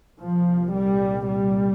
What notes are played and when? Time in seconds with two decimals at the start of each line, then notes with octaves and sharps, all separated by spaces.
0.20 C2 A#2 F3
0.73 G3
1.27 G3